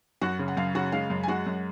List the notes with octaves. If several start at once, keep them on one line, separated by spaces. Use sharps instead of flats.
F#2 F#4 F#5
C#3
F#5
F#2 F5
C#3 F#4 F#5
G#3 F5
F#2
G#5
G#3 F#4 F#5
F#2